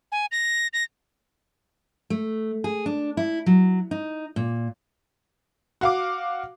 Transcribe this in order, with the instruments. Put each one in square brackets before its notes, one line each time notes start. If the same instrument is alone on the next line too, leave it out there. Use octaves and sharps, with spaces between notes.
[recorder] G#5
A#6
A#6
[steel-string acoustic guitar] A3
G#4
D4
E4
F#3
D#4
A#2
[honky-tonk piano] F#4 F5 D6